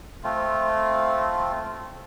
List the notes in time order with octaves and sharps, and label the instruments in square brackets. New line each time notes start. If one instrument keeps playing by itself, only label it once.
[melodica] A3 C4 F4